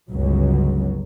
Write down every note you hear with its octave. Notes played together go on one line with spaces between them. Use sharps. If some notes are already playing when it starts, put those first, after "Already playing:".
G1 C#2 F#3